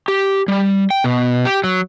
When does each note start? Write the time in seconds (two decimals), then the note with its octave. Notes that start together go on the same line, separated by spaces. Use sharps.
0.08 G4
0.48 G3
0.90 G5
1.04 B2
1.45 G4
1.64 F#3